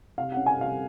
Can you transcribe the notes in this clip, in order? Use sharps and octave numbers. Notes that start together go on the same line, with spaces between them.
C3 F5
C#4 F#5
G#5
C3 F5